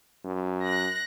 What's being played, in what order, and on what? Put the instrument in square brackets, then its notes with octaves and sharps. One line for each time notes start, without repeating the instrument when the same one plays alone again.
[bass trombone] F#2
[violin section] F#6 A#6